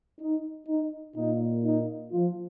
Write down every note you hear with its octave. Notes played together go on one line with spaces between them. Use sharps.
D#4
D#4
A#2 A#3 D#4
D#4
F3 F4